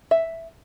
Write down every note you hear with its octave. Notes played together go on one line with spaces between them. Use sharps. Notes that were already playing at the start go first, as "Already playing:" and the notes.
E5